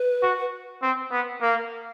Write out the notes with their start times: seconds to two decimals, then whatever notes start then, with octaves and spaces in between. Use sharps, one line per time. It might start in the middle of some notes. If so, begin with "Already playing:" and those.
Already playing: B4
0.23 F#4
0.82 C4
1.11 B3
1.42 A#3